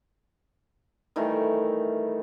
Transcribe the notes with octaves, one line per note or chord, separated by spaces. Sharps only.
D#3 E3 G3 A3